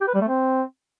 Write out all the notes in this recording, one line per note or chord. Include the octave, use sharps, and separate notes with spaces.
G4
B4
G3
A3
C4